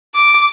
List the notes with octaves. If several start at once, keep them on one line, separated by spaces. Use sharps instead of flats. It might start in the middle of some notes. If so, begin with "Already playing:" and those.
D6